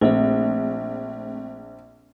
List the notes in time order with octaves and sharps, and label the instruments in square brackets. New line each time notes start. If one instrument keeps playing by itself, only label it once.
[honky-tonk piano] A#1 [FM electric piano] A3 C4